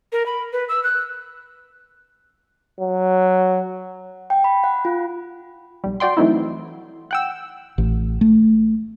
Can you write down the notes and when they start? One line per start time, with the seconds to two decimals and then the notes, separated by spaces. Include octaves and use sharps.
0.12 A#4
0.26 B5
0.53 B4
0.69 E6
0.84 F#6
2.80 F#3
4.30 G5
4.44 B5
4.64 F#5
4.85 F4
5.84 B1 G3
6.00 F#4 D5 G5 C6
6.17 E3 F#3 A3 C4 D#4 E4
7.11 F#5 G5 E6
7.78 A1
8.21 A3